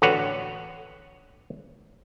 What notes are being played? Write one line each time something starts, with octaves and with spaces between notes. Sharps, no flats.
A1 D3 F#4 B4 C#5 F#5